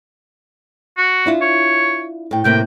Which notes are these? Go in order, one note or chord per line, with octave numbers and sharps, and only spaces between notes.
F#4
D4 E4 F4
C#5
A2 G5
A2 C3 A#3 G5